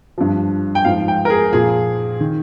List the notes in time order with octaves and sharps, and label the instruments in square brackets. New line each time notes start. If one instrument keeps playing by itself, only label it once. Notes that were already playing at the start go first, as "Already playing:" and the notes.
[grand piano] G2 F3
G5
G#2 F3 F5
G5
A#4
G#4
A#2 F3 G#4
D#3